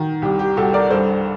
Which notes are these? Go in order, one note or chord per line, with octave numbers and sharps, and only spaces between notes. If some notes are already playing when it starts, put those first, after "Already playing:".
Already playing: D#3 F#4
C2 G4
G4
C2 F#4 A4
A#4 D5
G2 A4 C5